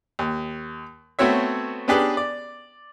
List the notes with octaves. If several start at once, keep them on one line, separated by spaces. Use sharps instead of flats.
D#2
A3 B3 C4 F#4 C#5 E5
B3 C#4 D4 G4 G#4 B4
D5